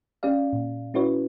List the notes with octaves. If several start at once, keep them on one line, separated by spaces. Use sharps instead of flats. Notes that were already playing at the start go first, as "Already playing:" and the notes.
C#4 G4 D5 F5
A#2
C#4 E4 F#4 B4 C#5